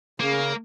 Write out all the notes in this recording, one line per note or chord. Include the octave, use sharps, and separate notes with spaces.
C#3 A#3